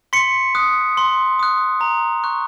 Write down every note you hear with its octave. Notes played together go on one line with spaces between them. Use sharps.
C6 B6 C#7
D#6 F#6
C6
D#6 F#6
A#5
C#6 F#6